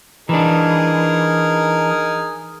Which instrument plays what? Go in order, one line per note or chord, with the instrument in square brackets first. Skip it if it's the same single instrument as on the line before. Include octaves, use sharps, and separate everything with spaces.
[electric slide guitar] E3 D4 [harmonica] D#4 G#4 A#4